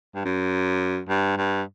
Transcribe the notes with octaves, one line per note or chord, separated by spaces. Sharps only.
G2
F#2
G2
G2